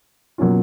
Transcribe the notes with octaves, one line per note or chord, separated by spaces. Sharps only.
B2 F#3 A#3 C#4 F4